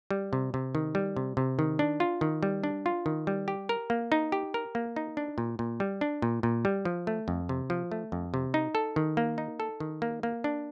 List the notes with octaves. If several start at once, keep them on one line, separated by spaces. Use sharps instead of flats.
G3
C3
C3
D#3
G3
C3
C3
D#3
D4
F4
D#3
G3
D4
F4
D#3
G3
G4
A#4
A#3
D#4
G4
A#4
A#3
D#4
D4
A#2
A#2
G3
D4
A#2
A#2
G3
F3
A3
F2
C3
F3
A3
F2
C3
D#4
A4
D#3
A#3
D#4
A4
D#3
A#3
A#3
D4